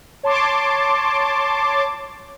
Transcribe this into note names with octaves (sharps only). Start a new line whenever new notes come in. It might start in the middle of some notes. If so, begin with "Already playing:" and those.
C#5 A5 C6 D6